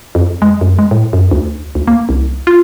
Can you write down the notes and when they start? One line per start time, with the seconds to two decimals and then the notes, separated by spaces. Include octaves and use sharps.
0.15 F2
0.42 G#3
0.61 F#2
0.79 G#3
0.91 A2
1.13 F#2
1.31 D2
1.75 D2
1.88 A#3
2.09 C2
2.47 F4